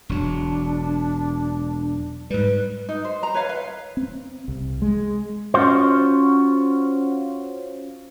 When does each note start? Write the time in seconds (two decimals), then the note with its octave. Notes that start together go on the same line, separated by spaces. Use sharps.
0.09 E1 F#3 D4
2.30 G#2 G3 B4
2.89 D#4
3.05 C5
3.23 A#5
3.34 B4 C#5 F5
3.49 B4 F5
3.97 C4
4.48 C2
4.82 G#3
5.54 C#4 F4 F#4 C5